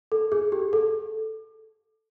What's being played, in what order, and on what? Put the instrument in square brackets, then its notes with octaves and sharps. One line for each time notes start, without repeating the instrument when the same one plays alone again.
[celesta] A4
G#4
G4
A4